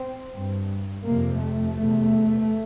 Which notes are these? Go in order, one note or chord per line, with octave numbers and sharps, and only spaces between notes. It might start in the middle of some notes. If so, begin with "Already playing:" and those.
Already playing: C4
G2
F2 C3 A#3
A3
E2 C3